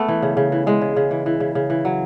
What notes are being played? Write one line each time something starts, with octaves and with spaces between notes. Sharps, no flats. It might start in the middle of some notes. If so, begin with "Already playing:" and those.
Already playing: A3 B3
E3
C#3
C#3
E3
E3 G#3
C#3
C#3
E3
E3
C#3
C#3
E3
F#3